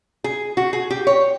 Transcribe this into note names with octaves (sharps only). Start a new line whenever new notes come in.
G#4
F#4
G#4
G4
C#5